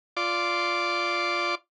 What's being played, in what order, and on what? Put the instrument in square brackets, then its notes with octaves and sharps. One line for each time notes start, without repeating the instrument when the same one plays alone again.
[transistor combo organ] F4 D5 C6 D6